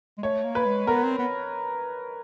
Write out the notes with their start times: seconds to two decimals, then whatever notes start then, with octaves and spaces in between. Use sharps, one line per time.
0.18 G#3
0.23 A3 C#5
0.44 A#3
0.55 B4
0.66 G#3
0.87 B3 A#4
1.04 C4
1.19 B3